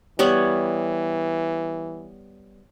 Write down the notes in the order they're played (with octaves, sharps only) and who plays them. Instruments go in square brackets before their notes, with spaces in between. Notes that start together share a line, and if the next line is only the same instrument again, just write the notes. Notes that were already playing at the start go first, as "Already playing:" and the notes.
[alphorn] E3 [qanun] G3 B3 C#5